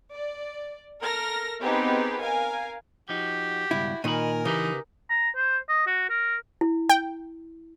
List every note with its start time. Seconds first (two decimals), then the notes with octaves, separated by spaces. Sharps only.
0.13 D5
1.00 A4 A#4 F6 A#6
1.60 B3 C4 D#4 G4 G#4 B4
2.20 A#4 F5 G#5
3.09 F3 D#4 F#4 G4
3.71 C#2 G2 B2 E4
4.04 A#2 D#3 A#4 D#5 G#5 B5
4.45 C#3 E3 D#4 G4 B4
5.10 A#5
5.35 C5
5.69 D#5
5.87 F#4
6.09 A#4
6.61 E4
6.89 G5